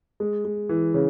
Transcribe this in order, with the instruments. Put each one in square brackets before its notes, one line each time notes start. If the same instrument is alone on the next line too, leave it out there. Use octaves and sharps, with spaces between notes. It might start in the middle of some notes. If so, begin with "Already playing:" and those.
[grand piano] G#3
G#3
E3
C#3